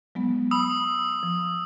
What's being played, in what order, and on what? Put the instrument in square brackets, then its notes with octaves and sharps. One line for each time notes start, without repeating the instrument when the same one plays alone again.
[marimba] F#3 G#3 B3
[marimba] B5 [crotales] D#6 E6
[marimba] F3